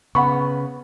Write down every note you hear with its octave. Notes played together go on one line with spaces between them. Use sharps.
C#3 B3 F#5 B5 C#6